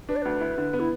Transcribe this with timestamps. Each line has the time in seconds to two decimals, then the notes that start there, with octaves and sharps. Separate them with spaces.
0.09 D4 B4
0.16 D5
0.22 D2 B4
0.41 E4
0.58 D3
0.73 B3
0.79 E4